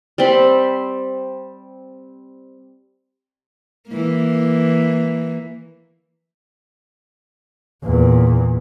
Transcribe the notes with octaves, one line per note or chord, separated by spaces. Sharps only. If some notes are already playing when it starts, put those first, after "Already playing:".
G3 C4 B5 C6
E3 A#3
E2 A#2